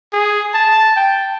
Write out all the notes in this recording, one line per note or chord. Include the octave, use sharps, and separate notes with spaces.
G#4
A5
G5